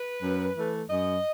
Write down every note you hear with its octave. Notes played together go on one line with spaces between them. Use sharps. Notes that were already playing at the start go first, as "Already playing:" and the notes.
Already playing: B4
F#2
E3 A3
F#2 D#5